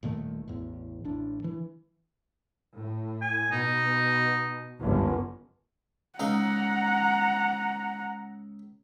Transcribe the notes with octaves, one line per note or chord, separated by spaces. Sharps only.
D#1 A#2 D#3 A3
A1 E2
A1 A2 D4
E3
A2
G#5
B2 D#4
G1 C#2 F#2
C#2 D#4 F5 F#5 A#5